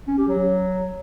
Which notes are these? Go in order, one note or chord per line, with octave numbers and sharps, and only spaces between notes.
C#4
G4
F#3